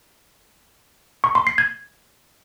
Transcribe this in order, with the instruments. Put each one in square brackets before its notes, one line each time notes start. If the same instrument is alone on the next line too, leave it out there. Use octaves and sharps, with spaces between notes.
[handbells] C#6
C6
C7
G#6